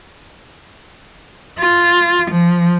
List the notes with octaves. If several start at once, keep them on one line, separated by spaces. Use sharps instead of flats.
F4
F3